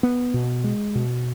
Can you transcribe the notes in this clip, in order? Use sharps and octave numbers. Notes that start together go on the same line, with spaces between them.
B3
B2
G#3
B2